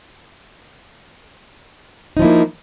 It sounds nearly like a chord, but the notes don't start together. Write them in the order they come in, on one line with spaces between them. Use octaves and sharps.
D#4 F3 E4 A#3